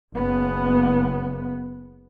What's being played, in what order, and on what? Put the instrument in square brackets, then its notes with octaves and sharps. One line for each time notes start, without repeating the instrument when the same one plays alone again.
[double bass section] F#1 B3